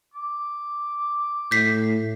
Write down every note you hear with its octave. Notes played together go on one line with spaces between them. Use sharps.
D6
A2 G6 B6 C7